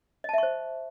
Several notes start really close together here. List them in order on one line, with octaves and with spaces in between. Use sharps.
D#5 A5 E5 C#6 C5